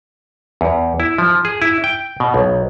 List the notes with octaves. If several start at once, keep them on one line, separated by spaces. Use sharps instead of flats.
E2
E4
F3
G#4
E4
G5
B2
B1